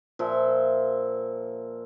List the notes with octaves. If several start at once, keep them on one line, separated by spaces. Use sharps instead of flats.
A#2 F3 E5 C6